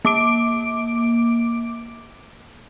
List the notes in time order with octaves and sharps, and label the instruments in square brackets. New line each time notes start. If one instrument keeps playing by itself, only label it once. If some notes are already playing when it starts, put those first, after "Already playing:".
[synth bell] A#3 D6 D7